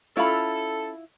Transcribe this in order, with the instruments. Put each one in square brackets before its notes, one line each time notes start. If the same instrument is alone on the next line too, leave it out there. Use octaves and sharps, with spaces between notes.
[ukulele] C#4 B5 [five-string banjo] E4 F4 [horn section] A4